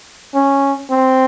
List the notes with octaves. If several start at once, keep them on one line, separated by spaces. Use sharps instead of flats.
C#4
C4